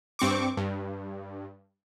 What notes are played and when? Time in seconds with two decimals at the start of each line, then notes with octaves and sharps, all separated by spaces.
0.19 G2 C4 C#6 D6
0.57 G2